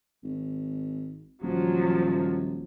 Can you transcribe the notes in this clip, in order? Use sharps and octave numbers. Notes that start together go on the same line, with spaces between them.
G#1
D#1 F3 F#3